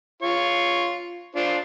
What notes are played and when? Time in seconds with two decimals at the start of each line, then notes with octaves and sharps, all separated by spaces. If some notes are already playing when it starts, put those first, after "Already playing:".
0.22 F4 C#5
1.36 D4 F4 C5